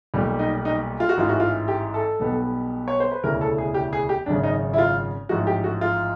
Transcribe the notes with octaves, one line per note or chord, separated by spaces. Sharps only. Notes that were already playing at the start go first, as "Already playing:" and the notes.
B1 A#2 G3
D#4
D#4
F4
F#4
A1 G#2 E3 F4
F#4
F4
G4
A4
B1 B2 G3 B3
C#5
C5
B4
E1 D2 C#3 E3 A#4
A4
G#4
G4
G#4
G4
G#1 F#2 C#3 D4
D#4
E4
F4
A1 G#2 F3 F#4
G4
F#4
F4